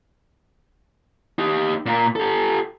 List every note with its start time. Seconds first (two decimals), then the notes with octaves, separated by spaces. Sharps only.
1.39 D#4 G4
1.86 A#2 A#3
2.16 G4 A4